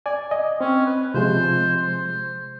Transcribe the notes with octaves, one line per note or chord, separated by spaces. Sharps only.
D5 G#5
D#5
C4 C#4
B4
C3 F3 G#3 C5
C5